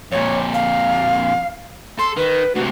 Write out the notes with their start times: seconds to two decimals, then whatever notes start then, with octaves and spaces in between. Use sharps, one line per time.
0.12 F2 A#2 C#5
0.54 F5
1.99 A4 C6
2.17 D#3 B4
2.55 D2 C3 F#4